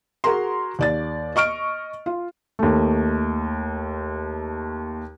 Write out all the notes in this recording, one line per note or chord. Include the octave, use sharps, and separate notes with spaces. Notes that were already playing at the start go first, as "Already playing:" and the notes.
F#4 G#4 A#4 A#5 C6
D#2 D5 A6
D#5 C#6 F6 D7
F4
D#2 A3